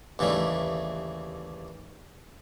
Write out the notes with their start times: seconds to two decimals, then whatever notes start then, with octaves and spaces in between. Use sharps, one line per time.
0.19 D#2 C#3 E3 G3 A3